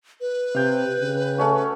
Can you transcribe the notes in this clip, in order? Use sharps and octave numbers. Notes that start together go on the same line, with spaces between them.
B4
C3 F5 G5
C#3
A3 C#4 F#4